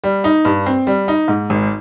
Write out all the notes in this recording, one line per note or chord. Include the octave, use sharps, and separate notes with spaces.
G3
D#4
G2
C4
G3
D#4
G#2
G#1